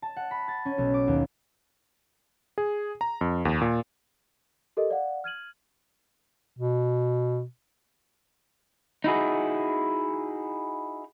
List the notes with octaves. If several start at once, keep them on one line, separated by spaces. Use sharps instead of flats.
A5
F#5
B5
A6
C#4
B1
D6
D#2
G#4
A#5
F2
D#2
A#2
G4 A4 A#4 D#5
D5 F5 F#5
F6 G#6 D#7 F#7
B2
D#4 E4 F#4 G#4